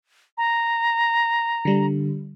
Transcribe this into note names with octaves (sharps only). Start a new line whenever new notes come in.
A#5
D3 G3